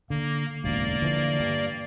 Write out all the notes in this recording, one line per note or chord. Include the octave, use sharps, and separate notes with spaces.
D3 A#3
E1 A1 D2 A#3 D5
D3 E3 F3
G2